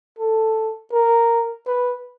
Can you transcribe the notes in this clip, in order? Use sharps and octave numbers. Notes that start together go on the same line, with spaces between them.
A4
A#4
B4